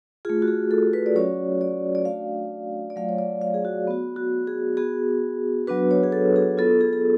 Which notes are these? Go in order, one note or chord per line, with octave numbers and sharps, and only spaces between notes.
A3 F4 G#4
F#4
G#4
A4
B4
D5
F#3 C#4 F#4 C#5
D5
D5
A3 D4 F#4 F5
D5
F#3 A3 F4 F5
C#5
D5
F5
G#4
F#4
B3 F#4
F#4
G#4
B3 F#4 G#4
F#3 B3 D4 F#4 B4
C#5
G#4
A4
G#4
B3 F4 A4
G#4
G#4